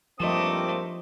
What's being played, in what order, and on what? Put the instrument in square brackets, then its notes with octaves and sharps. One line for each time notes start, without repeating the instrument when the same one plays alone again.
[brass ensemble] G2 A#3 C4 [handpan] F3 D#5 [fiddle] A3 [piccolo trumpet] D6